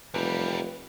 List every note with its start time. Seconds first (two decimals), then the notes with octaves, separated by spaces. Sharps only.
0.14 F1 E2 G3 B4